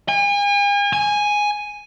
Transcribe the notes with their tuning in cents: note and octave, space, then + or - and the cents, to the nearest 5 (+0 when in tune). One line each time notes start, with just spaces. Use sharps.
G#5 -40
G#5 +0